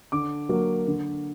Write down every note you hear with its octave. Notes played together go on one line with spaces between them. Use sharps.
D3 D6
F#3 A#3
D3